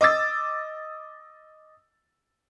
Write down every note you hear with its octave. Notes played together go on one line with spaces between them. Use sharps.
D#5 D6 E6 A6